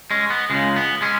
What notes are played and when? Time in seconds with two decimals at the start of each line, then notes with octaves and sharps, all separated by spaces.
0.11 G#3 C#4
0.30 B3
0.50 C#2 C#3 G#3
0.76 B3
1.02 G#3 C#4